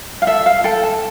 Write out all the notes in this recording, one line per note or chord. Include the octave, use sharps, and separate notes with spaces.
F5
A4 E5
F5
A4 G5
A5